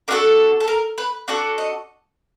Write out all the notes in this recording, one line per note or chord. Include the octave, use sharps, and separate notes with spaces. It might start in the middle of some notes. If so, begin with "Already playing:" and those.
D4 F#4 A4 A#4
A4
A#4
B4
D4 F#4 A4 D5
D#5